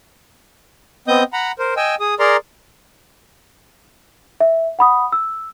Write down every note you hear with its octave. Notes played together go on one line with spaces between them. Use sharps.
B3 C4 D#5 D#6 G6
F#5 A#5 B5
A#4 C5
D#5 G5 G#5 E6
G#4 D#6
G#4 A#4 D5 A#5 C6
E5
F#5 B5 D#6
E6